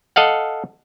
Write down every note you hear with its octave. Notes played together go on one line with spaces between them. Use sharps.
A4 D#5 F5 F#5